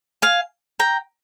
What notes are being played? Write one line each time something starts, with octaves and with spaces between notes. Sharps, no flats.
F5 G#5
G5 A#5